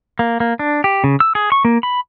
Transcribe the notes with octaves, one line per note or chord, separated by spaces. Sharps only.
A#3
A#3
D4
G4
C#3
E6
G#4
C#6
A#3
B5